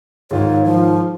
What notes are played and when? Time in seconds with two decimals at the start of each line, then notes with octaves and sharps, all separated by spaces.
0.31 G#2 D#3 F4 C#5
0.65 F3